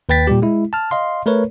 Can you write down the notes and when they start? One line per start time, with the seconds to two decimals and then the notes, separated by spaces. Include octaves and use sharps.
0.09 D#2 B4 G5 A6 B6
0.27 A#2 G3 G4
0.42 G#3 E4
0.73 A5 F6
0.91 D#5 F5 C6
1.26 A3 A#4 B4 C#5